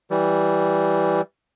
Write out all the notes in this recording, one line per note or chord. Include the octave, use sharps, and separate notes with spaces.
E3 G3